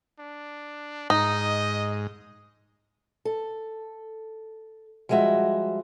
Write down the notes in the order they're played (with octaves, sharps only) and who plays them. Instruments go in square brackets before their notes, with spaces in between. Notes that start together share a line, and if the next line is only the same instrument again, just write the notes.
[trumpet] D4
[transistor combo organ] G#2 [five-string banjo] D#4 [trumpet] D#5
[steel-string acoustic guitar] A4
F3 G3 G#3 F#4 E5